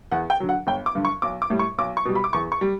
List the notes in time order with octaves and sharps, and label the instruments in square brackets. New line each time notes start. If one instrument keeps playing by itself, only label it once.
[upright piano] E2 F#5
G5
D3 F#3
F#5
G1 G5
D6
G2 D3
C#6
B1 D6
D6
A2 G3
C#6
B1 D6
C#6
B2 G3
B5
D6
E2 C#6
C#6
G3